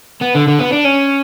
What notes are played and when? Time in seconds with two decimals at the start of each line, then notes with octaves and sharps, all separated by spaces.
0.21 B3
0.35 D3
0.47 D3
0.59 B3
0.72 D4
0.84 C#4